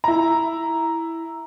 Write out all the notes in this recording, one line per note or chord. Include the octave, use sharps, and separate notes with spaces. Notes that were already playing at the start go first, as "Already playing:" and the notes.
E4 A#5